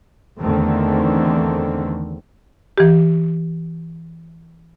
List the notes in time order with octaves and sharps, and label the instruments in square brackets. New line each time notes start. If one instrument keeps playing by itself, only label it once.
[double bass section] E2 D3 D#3 A3 C4
[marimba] E3 G4